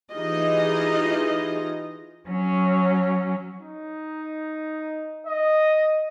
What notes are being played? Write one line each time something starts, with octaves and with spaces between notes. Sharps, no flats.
E3 D#4 F4 G4 G#4 D#5
F#3 C#4
D#4
D#5